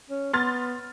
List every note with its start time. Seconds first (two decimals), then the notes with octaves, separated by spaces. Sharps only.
0.10 C#4
0.33 B3 C6 F6 A6